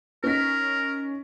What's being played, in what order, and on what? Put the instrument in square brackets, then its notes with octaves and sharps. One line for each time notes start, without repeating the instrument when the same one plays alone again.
[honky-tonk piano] C#4 D#4 B6 [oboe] A#4